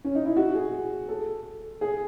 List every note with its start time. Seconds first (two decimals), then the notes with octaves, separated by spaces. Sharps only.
0.04 C#4
0.15 D#4
0.25 E4
0.36 F#4
0.55 G#4
1.08 A4
1.81 G#4